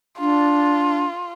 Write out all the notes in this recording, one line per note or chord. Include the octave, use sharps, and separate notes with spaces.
D4 F4